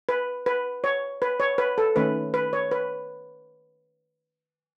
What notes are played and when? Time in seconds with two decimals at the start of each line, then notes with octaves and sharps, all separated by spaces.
0.09 B4
0.46 B4
0.84 C#5
1.22 B4
1.40 C#5
1.58 B4
1.78 A4
1.96 D#3 A3 C#4 B4
2.34 B4
2.53 C#5
2.71 B4